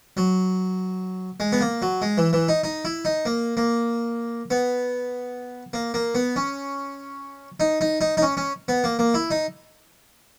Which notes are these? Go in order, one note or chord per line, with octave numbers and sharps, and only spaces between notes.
F#3
G#3
B3
A#3
F#3
G#3
E3
E3
D#4
D#4
E4
D#4
A#3
A#3
B3
A#3
A#3
B3
C#4
D#4
D#4
D#4
D#4
C#4
C#4
B3
A#3
A#3
E4
D#4